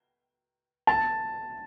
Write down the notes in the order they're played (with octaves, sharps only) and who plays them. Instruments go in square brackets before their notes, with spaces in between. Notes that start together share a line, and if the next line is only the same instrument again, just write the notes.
[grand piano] A5